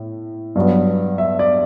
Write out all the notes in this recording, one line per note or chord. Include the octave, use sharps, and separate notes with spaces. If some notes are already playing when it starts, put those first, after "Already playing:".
Already playing: A2
G2 F#3 B3
E5
D5